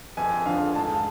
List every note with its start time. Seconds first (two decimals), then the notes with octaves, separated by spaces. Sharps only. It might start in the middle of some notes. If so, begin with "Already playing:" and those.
0.17 F2 G#5
0.46 D3 F3 F5
0.75 G#2 A5